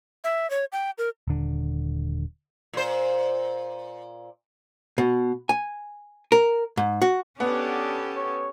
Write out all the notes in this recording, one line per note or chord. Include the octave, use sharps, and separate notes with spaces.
E5
C#5
G5
A#4
D#1 D3
A#2 C5
B2
G#5
A#4
G#2
F#4
B3 C#4 D4 G4 A4 F#5
C#5